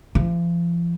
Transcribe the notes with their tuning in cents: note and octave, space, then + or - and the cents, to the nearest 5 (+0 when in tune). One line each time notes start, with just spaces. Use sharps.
F3 -35